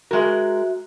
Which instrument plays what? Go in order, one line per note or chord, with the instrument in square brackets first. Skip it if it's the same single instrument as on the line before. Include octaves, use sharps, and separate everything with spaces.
[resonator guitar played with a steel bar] G#3 A#4 [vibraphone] F#4 E5